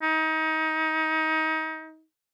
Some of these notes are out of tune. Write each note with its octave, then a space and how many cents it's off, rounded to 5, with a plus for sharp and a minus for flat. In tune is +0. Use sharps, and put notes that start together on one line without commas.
D#4 +25